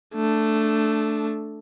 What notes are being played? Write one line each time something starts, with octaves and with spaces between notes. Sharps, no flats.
A3 D4